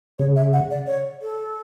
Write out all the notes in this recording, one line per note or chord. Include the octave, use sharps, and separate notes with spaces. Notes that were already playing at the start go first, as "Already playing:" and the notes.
C#3 C#5
E5
F#5
D5
C#5
A4